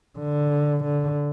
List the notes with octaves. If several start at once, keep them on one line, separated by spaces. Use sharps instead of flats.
D3
D3